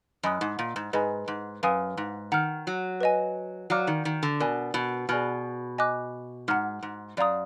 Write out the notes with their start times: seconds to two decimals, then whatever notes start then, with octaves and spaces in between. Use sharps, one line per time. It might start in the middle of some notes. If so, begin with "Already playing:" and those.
0.23 F#2 D#5 G#5 B5 D#6 F#6
0.41 G#2
0.59 A#2
0.76 G#2
0.93 G#2 G#4 B4 D#5 G#5 B5
1.28 G#2
1.63 F#2 B4 F5 G#5 D#6
1.97 G#2
2.32 D#3 F#5 A#5 F6
2.67 F#3
3.01 B4 D#5 G#5
3.70 F#3 D5 F5 A#5 D6 F6
3.87 D#3
4.05 D#3
4.23 D3
4.40 B2 A#4 D5 G#5 B5
4.74 B2
5.09 B2 G#4 D5 G#5 B5 F6
5.78 D#5 G#5 D6 F#6
6.48 G#2 F#5 A#5 F6
6.83 G#2
7.17 F#2 D5 F5 A#5 D#6